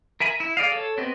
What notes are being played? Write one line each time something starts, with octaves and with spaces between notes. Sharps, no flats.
A#4 E5 G#5 B5
E4
G#4 D5 D#5 F5
A4 C#5
B3 C4 G4 D#5